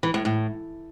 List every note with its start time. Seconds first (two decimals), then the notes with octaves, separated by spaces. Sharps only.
0.03 E3
0.14 A2
0.25 A2